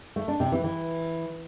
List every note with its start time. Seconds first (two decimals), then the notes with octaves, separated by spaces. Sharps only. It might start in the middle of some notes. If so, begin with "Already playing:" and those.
0.16 A3
0.28 D4
0.40 C3
0.52 E3
0.64 E3